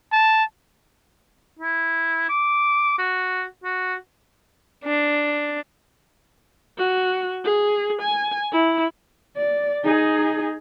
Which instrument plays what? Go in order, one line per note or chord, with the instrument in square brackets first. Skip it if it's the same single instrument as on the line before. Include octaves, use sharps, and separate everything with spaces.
[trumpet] A5
[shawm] E4
D6
F#4
F#4
[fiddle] D4
[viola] F#4
G#4
G#5
E4
[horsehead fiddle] D5
D#4 G#4